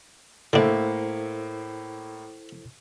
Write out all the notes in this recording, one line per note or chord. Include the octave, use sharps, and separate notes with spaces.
A2 D3 A#3 D4 E4 A4 C5 E5